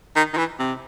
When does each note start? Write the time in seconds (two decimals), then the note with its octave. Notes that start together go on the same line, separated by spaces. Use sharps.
0.16 D#3
0.33 D#3
0.38 E3
0.59 C3